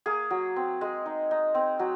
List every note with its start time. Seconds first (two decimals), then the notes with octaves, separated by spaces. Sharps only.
0.06 A#3 G#4
0.31 F#3
0.56 C4
0.81 G#3
1.06 D#4
1.31 D#4
1.55 C4
1.79 F#3